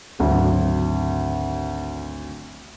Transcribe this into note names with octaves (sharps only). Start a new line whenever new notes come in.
G#1 D2 F#3